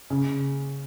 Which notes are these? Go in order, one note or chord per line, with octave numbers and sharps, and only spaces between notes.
C#3